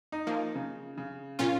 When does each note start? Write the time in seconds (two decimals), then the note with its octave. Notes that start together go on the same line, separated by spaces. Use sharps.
0.12 D#4
0.27 F3 A#3
0.55 C#3
0.98 C#3
1.39 A#2 C#4 F4